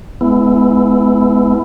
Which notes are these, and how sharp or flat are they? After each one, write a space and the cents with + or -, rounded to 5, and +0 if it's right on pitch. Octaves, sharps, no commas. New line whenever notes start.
G#3 +25 B3 +20 E4 +0